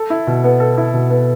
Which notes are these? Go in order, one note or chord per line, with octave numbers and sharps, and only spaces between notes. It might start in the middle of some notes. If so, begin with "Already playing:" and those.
Already playing: A4
E4
B2
B3
A4
E4
B2
B3